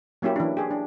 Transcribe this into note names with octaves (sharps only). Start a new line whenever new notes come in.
F#3 A#3 C#4 E4 G4
E3 D4
G4 G#4
D4